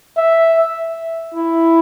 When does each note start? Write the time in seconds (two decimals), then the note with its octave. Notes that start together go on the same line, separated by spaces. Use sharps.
0.17 E5
1.34 E4